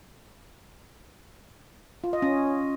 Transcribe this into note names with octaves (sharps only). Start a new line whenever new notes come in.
F4
D#5
C#4